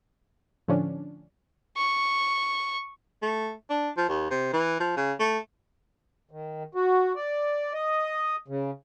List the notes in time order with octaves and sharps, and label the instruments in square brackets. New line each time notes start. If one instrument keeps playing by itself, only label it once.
[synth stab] A2 D3 F3 C#4 D4
[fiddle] C#6
[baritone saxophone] A3
D4
F3
D#2
C3
E3
F3
C#3
A3
[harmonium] D#3
F#4
D5
D#5
C#3